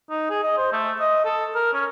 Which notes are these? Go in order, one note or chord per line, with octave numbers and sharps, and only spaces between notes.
D#4
G#4
D#5
C5
A3
D#5
A4
A#4
C#4